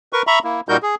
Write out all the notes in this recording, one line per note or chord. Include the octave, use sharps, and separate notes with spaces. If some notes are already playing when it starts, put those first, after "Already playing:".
A#4 B4 C#6
E5 A#5 B5 C#6
A#3 E4
A#2 G3 D#4 F#4 A#4 G6
G#4